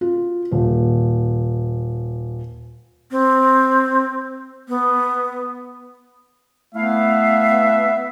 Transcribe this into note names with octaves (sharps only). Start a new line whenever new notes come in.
F4
D#1
C4
B3
A3 B3 E4 E5 F5